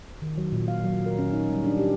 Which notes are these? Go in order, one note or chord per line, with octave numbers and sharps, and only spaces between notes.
D#3
F#3
A#2
F5
F#3
A#4
C#4
D#4
G3
D4
G4